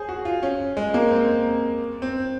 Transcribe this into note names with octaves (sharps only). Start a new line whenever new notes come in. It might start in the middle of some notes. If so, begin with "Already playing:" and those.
Already playing: G#4 C5 C#5
F#4
F4
C#4
G#3
A#3
C4
C4